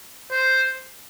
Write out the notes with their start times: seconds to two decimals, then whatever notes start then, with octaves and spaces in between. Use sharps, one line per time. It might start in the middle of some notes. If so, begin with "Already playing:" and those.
0.31 C5